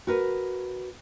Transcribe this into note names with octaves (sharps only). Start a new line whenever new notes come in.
F#4 A#4 B4